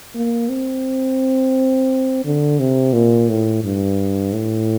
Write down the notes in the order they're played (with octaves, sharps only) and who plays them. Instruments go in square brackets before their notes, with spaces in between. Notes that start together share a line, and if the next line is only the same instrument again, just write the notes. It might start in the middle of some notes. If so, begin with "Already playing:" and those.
[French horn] A#3
C4
D3
C3
A#2
A2
G2
A2